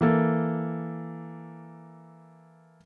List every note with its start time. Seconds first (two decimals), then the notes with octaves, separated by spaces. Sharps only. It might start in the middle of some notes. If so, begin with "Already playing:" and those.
0.01 E3 A#3 A4